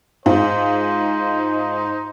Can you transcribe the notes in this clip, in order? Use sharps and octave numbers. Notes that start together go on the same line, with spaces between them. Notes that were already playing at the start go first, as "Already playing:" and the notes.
G#2 D#4 F4 C5